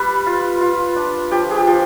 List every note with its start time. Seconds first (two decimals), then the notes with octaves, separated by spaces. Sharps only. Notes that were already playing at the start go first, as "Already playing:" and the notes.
Already playing: G3 B4
0.26 F4
0.61 F4
0.96 D4
1.31 F3 G4
1.51 G#4
1.56 G4
1.67 F3